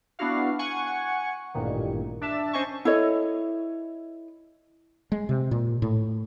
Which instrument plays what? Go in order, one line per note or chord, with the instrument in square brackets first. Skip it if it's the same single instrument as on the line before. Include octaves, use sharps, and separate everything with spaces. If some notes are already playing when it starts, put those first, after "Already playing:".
[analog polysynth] B3 D4 E4 F#4 F5
F#5 G#5 C#6
A1 G2 A#2 D#3
D4 E5 A5
C#4 C5 D#5 G#5 A5 C#6
[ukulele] E4 A4 C#5 D#5
[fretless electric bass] G#3
C3
A#2
A2